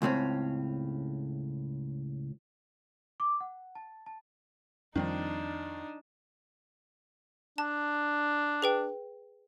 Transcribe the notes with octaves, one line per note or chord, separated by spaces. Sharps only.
C#2 A2 C4 C#4
D6
F#5
A5
A5
F2 D#3 F3 G3 C4 D4 D#4
D4 A5
G#4 B4 G5